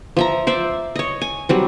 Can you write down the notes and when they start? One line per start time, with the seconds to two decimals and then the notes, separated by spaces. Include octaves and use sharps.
0.17 F3 E5 A#5
0.47 C5 D5 E5
0.96 C#5 D#5
1.21 G#5
1.49 F#3 G3 C4